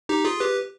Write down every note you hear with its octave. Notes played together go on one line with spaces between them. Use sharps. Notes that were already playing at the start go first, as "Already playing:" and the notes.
D#4 G4
F4 G#4
G4 B4